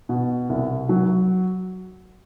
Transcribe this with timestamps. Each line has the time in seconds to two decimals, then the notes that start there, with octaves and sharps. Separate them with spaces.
0.09 B2
0.49 C2
0.89 F#3